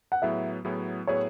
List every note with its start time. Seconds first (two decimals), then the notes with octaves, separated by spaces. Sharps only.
0.12 F#5
0.22 A2 F#3 B3 E4 G#4 E5
0.65 A2 F#3 B3 E4 G#4
1.07 A2 F#3 B3 E4 G#4 C#5